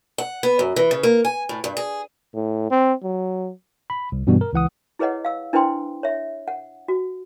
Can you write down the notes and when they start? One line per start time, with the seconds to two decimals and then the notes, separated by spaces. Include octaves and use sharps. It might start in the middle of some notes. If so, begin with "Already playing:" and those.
0.18 F#5
0.43 B3
0.59 F#2
0.76 E3
0.91 C#3
1.03 A#3
1.25 G#5
1.49 A2
1.64 G2
1.77 G#4
2.35 A2
2.71 C4
3.03 F#3
3.90 B5
4.12 C2
4.27 G2 B2 E3 G3 B3 F#4
4.41 A#4
4.53 C#2 E3 F#5 D#6
4.99 E4 G#4 B4 C#5 D#5 F#5
5.25 F5 E6
5.53 D4 E4 B4 C5 G5 C6
6.03 C#5 E5
6.48 F#5
6.88 F#4